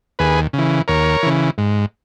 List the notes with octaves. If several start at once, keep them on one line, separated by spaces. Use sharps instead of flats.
D#2 G#4 B4
C#3
E3
D#2 A#4 C#5
C#3 E3
G#2